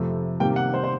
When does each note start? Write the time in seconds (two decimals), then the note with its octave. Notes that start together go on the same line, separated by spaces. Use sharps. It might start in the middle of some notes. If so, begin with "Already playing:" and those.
Already playing: F2 C3 F3 A3
0.40 C3 D#3 G3 A#3 G5
0.56 F#5
0.74 C5
0.84 C5